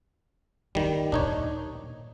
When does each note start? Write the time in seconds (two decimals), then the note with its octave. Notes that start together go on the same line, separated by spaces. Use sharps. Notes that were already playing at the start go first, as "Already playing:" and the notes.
0.75 D#2 D#3 G3
1.12 A#2 D4 D#4 C#5